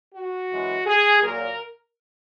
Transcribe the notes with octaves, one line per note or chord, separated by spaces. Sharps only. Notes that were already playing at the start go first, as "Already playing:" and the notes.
F#4
F#2 E3 G#3
G#4
A#2 F#3 A#4